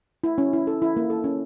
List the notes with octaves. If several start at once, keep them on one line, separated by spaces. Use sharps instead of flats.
E4
C#4
E4
A4
E4
A#3
A4
C#4